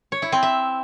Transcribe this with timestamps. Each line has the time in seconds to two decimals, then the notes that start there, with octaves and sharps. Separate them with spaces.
0.12 C#5
0.22 E4
0.32 C4
0.43 E5